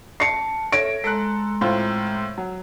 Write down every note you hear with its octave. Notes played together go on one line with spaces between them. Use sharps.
A5 C7 C#7
A4 C#5 E5 A#6 D7
G#3 A4 A#5 C6 F#6
A2 C4 F4
F#3